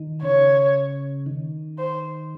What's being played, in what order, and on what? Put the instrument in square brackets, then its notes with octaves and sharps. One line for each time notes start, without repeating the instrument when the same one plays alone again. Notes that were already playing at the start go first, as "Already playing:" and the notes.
Already playing: [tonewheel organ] D#3
[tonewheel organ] C#3 [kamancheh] C#5
[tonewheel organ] D#3
[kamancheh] C5